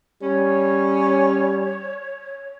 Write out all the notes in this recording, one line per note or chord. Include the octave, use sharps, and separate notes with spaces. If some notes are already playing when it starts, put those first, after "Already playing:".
G3 C#4 C#5